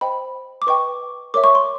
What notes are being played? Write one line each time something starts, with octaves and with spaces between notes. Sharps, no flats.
C5 D#5 G5 B5
D6
B4 D#5 G5 C#6
A#4 C#5 E5 D6
C#6
C6